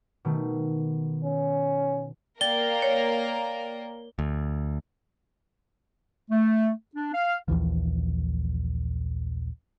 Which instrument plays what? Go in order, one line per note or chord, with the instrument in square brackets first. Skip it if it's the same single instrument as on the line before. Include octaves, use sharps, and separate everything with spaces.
[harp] B2 D#3 A3
[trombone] C#4
[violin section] A#3 A#4 [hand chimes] D5 G5 A6 [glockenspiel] G7
[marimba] C#5
[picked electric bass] D2
[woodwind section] A3
D4
F5
[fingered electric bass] A#1 D#2 E3 F3